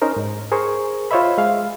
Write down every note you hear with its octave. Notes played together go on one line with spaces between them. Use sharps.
C#4 D#4 A#4 C5
G#2
G#4 A#4 C5 C#6
F4 C5 C#5 D#5 E5 B5
G#3 F5